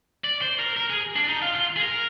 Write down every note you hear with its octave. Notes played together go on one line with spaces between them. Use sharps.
D5
C5
A#4
A#4
G#4
D4
D#4
F4
F4
G#4
A#4